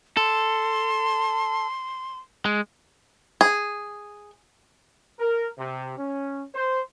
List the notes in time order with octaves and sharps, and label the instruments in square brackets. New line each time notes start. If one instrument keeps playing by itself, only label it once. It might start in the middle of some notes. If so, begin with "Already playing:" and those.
[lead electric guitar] A4 [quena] C6
[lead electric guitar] G#3
[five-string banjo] G#4
[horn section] A#4
C3
C#4
C5